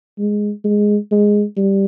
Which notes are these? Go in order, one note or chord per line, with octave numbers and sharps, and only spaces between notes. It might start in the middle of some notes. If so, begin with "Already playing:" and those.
G#3
G#3
G#3
G3